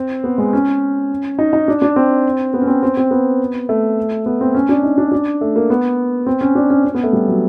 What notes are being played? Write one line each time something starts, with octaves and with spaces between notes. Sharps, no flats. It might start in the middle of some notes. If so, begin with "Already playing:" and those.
Already playing: C4
B3
G#3
C#4
D#4
D#4
D4
D4
C4
B3
C#4
C4
C4
C4
B3
A3
B3
C4
C#4
D4
D#4
D4
D4
A3
A#3
B3
C4
C#4
D4
C#4
C#4
B3
A3
G3
F#3